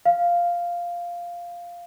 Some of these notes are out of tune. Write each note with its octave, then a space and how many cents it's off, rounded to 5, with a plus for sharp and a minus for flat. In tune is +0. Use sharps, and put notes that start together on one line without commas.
F5 +0